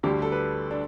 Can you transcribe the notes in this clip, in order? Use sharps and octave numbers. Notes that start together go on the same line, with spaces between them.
D2 D3 G3 G4
G4
A4
B4
D4